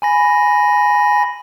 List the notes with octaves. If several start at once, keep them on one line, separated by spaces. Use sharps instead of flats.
G#5 B5 A#6